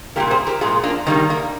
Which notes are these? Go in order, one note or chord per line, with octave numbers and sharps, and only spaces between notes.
A#2 G3 A#3 G4 A#4
G#4 C5
G4 A#4
A#2 F3 G#3 F4 G#4
A#3 D4
D#3 G3 A#3 C4
A#3